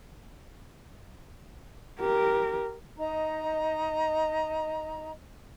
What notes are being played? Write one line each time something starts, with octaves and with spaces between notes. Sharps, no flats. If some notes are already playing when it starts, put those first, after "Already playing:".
G4 A#4
D#4 D#5 A#5